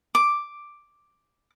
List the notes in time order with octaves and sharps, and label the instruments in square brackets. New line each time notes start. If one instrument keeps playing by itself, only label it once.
[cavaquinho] D6